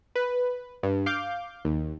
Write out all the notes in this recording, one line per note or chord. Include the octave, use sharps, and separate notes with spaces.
B4
G2
F5 D6 G6
D#2